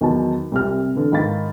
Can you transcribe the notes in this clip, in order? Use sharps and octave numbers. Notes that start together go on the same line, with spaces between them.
E2 D#3 F#3 A5
C2 C3 F6
D3 E3
G#2 D#3 F5 B5 A6